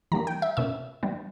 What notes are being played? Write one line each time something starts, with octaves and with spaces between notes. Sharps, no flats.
E3 G3 A#3 D4 A#5
G5
E5
B2 A#3 C#4 E5
E3 G3 B3 D4